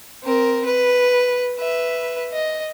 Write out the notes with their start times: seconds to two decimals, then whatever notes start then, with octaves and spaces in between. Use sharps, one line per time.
0.24 C4 A#4
0.65 B4
1.58 B4 E5
2.33 D#5